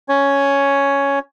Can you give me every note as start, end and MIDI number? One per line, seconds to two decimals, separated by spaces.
0.09 1.19 61
0.09 1.19 73